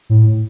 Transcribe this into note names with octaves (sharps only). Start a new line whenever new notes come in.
A2